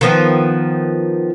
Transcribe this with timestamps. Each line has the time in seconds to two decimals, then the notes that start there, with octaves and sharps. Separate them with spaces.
0.01 D#3 F3 B3